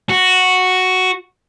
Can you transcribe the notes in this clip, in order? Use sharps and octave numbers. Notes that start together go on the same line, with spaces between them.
F#4